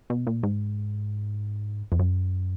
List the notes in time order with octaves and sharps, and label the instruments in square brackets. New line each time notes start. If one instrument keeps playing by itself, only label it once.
[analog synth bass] B2
A#2
G#2
F2
F#2